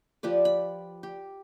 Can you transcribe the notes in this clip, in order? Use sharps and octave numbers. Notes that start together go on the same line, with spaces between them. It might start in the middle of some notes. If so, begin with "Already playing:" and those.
F3 G4 B4 D5
B5
G4